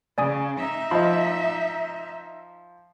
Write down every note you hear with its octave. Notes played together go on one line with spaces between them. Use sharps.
C#3 D5 G#5 D#6
D#4 E5
F3 D#5 B5